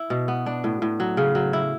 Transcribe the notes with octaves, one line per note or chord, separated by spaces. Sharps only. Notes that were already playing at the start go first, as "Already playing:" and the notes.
Already playing: E4
B2
B3
D4
A2
A2
F#3
C#3
F#3
E4